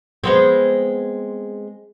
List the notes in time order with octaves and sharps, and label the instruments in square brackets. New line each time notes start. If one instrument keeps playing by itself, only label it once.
[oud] G#3 B3 C4